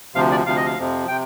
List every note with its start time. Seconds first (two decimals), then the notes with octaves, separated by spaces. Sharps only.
0.15 D2 C3 F3 F5
0.31 D5
0.46 D2 C3 F3 F5
0.56 D#5
0.66 F5
0.77 F2 C3 F3
1.08 C3 G5